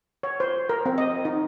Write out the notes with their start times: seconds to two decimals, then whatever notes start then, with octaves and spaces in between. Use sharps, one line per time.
0.23 C#5
0.40 C5
0.69 A#4
0.86 C4
0.98 D#5
1.25 D#4